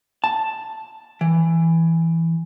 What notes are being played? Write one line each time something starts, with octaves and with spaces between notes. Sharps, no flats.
A5
E3